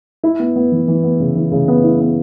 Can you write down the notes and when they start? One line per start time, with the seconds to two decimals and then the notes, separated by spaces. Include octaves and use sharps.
0.23 E4
0.40 B3
0.56 B3
0.72 E3
0.88 E3
1.04 B3
1.20 C#3
1.36 E3
1.52 C#3
1.68 B3
1.84 E4
2.00 B3